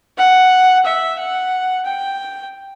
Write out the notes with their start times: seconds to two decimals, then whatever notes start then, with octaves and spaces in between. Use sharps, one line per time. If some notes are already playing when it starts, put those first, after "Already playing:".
0.18 F#5
0.85 E5
1.19 F#5
1.85 G5